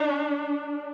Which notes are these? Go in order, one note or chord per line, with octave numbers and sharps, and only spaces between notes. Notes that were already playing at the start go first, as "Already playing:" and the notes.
Already playing: D4